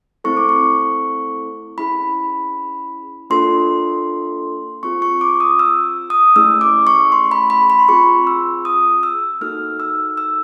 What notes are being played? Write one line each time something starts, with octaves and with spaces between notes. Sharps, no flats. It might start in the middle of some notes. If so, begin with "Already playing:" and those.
A3 C4 E4 A4 C#6
D6
C#6
C#4 E4 G#4 B5
A#3 D4 F4 A4 C6
C4 F4 G#4 C#6
C#6
D6
D#6
E6
D#6
A3 C#4 E4 G#4 E6
D6
C#6
C6
B5
B5
B5
C6
C4 F4 G#4 C#6
E6
D#6
E6
A#3 D#4 F#4 A4 F6
E6
E6